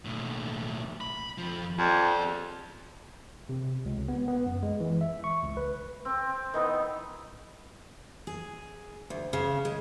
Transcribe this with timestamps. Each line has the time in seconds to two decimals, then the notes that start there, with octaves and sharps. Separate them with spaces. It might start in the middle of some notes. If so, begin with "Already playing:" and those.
0.05 B1 A2
1.01 B5
1.38 F2 F3
1.79 F2 G#4 D5
3.49 C3
3.85 C#2
4.08 B3
4.28 B3
4.46 F#2
4.63 G#3
4.80 E3
5.01 E5
5.24 C#6
5.43 C#2
5.57 B4
6.05 C4
6.54 D#3 E3 B3
8.27 G#4
9.10 D2
9.33 C#3
9.65 G#3